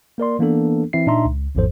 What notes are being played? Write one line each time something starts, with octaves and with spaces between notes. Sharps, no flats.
A#3 A#4 D5 C6
E3 A#3 B3 D4 A4
E3 C4 E4 E5 C7
A#2 D4 D#4 E5 A#5 C6
C#2
G#1 E2 G#2 F3 A4 C5